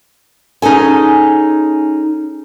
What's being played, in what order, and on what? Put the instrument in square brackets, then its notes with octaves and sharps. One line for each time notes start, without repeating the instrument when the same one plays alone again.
[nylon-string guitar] C#4 D#4 G#4 A4 G#5